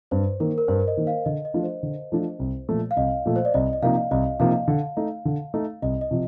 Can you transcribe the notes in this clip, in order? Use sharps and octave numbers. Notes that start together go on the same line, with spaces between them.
G2 C5
D#3 A#3 A#4
A#4
G2 C5
D#5
D#3 A#3
F5
D3 D#5
D#5
F3 A3 D4 F4
C5
D3
F3 A3 D4 F4
C2
A#2 F3 A3
F5
C2 D#5
A#2 F3 A3
C5
D5
C2 D#5
D#5
C3 F3 A#3 D#4 F5
C2 D#5
C3 F3 A#3 D#4 F5
D3
A3 D#4
D3
A3 D#4
C2 D#5
D#5
C3 F3